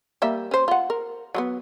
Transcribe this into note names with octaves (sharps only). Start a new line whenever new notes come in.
G3 A#3 E5
C#4 C5
F4 F#5
A#4
F#3 G#3 B3